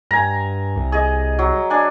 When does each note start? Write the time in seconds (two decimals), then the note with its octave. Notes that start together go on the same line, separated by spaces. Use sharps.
0.11 G2 G#5 A#5
0.76 C2
0.92 G#4 D#5
1.39 F#3
1.70 D4 G#5